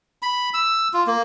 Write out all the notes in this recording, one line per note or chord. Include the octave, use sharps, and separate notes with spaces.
B5
E6
F4
A#3